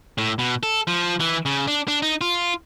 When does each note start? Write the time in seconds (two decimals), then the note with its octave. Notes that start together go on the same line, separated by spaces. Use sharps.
0.18 A2
0.39 B2
0.63 A4
0.87 F3
1.20 E3
1.46 C#3
1.68 D4
1.88 D4
2.02 D#4
2.21 F4